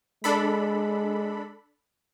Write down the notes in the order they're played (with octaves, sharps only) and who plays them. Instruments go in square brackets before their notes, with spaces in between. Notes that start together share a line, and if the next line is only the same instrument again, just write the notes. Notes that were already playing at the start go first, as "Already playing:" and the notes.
[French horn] G#3 [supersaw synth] D4 A4 B5